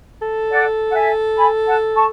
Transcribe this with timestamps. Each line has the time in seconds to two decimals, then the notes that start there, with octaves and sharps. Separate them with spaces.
0.22 A4
0.50 D5 F#5
0.90 F#5
0.95 E5 G#5
1.37 G#5 B5
1.65 F#5 A5
1.94 A5 C#6